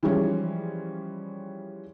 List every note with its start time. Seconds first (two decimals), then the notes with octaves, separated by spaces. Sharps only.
0.03 E3 F3 G3 G#3 C#4